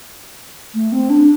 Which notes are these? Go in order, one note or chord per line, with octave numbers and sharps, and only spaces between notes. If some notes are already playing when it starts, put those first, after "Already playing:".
A3
C4
D4